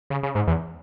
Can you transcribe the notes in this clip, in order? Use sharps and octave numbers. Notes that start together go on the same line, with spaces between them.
C#3
C#3
G#2
E2